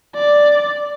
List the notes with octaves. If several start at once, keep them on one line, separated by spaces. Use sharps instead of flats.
D5